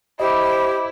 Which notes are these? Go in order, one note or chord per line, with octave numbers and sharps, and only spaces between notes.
E4 G4 C5 D#5 D6